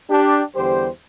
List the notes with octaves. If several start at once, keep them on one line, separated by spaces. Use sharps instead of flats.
D4 G4
E2 D3 G3 G4 C5